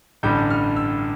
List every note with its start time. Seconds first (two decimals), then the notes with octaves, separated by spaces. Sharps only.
0.23 A1 G2 D3 G3 G6
0.50 F6
0.76 E6